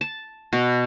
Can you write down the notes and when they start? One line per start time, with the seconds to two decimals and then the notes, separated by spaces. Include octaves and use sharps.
0.01 A5
0.53 B2